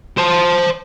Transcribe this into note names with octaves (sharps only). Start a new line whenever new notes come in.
C5 A5